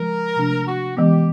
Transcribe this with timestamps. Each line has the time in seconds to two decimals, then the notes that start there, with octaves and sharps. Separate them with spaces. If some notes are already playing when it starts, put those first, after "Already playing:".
Already playing: C#3 F3 G#3 A#4
0.36 C3 F3 A3 D4
0.67 F#4
0.97 E3 G#3 B3 G4